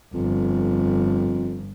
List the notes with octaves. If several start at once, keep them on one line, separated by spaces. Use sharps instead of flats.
G1 F2